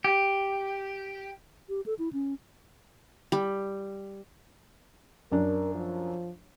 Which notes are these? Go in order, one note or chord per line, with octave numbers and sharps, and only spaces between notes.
G4
G4
A4
E4
C#4
G3
F#2 D4 A#4
F3